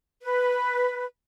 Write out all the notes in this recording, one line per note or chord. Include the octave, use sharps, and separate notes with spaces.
B4